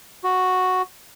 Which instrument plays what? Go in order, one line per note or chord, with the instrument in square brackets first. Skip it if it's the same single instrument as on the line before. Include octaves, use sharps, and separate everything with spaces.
[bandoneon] F#4